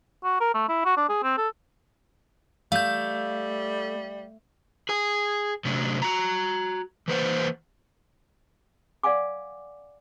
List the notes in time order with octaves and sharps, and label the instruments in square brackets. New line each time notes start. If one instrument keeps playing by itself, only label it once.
[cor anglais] F#4
A#4
A3
E4
F#4
D4
G#4
C4
A4
[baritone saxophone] G3 [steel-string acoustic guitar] A3 [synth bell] F5 G6
[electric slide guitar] G#4 G#5
C3 F#3 A3 C#4 D4
F#4 A#5
E3 A#3 B4 C5 D#5 F#5
[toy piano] D5 F5 F#5 G#5 D6